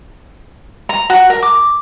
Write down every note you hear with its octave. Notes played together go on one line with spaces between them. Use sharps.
A#5
F#4
A#4
D6